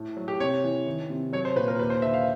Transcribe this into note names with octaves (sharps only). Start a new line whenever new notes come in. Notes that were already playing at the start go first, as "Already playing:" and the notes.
Already playing: A2
F#3
G4
C3 C#5
E3
D#3
C3
F#3 C#5
C5
A#2 B4
A#4
D#2 B4
C5
D3 E5
F5